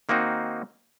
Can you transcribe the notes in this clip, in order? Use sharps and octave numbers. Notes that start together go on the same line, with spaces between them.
D#3 A#3 C4 D#4 F#4